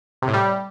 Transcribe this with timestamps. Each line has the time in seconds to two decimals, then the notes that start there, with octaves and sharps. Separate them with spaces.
0.22 C3
0.28 A2
0.34 G3